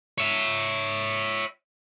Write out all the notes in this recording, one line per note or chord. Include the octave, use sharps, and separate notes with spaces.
C#5 E5